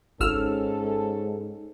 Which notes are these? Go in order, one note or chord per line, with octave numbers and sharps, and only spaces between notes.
G#1 G#2 C#4 A4 E6 F6